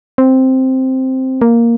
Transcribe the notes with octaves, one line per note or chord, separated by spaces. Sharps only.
C4
A#3